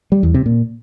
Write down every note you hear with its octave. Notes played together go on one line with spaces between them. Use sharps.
G3
E2
C3
A#2